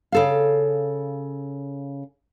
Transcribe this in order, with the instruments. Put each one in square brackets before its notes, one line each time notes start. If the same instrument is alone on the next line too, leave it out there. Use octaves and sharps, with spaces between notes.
[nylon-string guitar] C#3 A4 F5